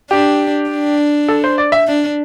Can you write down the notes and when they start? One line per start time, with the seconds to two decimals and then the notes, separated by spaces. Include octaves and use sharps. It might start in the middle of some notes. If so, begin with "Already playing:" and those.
0.11 D4 G4
0.70 D4
1.28 A4
1.44 C5
1.58 D5
1.72 E5
1.87 D4